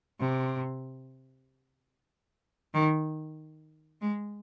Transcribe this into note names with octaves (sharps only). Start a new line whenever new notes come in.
C3
D#3
G#3